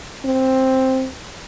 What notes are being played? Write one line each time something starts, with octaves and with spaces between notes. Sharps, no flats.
C4